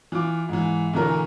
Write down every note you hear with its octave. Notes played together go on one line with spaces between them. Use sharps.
E3 F4 D6
G#2 E3
B1 D3 E3 A3 A#4